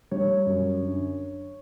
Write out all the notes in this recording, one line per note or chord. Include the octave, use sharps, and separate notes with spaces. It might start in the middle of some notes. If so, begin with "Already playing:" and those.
G3 C#5
F#2
D3